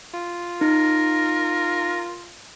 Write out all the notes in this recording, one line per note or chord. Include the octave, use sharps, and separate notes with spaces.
F4
D#4 A#4